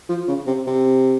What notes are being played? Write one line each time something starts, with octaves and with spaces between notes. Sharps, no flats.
F3
C#3
C3
C3